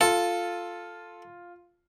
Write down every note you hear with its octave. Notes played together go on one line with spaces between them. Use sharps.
F4 A4